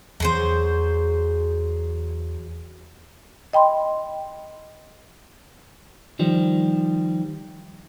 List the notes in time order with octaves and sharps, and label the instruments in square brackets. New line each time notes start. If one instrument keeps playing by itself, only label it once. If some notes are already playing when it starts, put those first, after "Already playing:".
[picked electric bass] E2 E3 [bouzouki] F#3 G#4 C5
[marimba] D#5 G5 B5 C6
[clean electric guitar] D#3 F3 G3